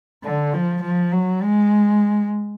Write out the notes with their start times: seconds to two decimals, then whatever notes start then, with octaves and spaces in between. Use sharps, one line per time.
0.24 D3
0.54 F3
0.82 F3
1.12 F#3
1.42 G#3